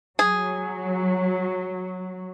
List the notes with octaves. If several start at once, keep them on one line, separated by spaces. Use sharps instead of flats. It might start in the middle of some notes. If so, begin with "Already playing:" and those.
F#3 G#4